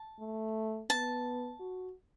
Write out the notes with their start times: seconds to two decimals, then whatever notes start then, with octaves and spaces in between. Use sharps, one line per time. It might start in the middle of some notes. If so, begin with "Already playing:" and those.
Already playing: A5
0.19 A3
0.90 B3 A5
1.60 F#4